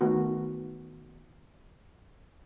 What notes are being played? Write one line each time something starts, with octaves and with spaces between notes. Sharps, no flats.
D#3 A3 B3 F#4